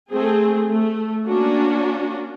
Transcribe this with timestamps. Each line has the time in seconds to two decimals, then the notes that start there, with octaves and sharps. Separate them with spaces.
0.10 A3 C4 G#4
0.70 A3
1.26 A#3 C#4 D4 F#4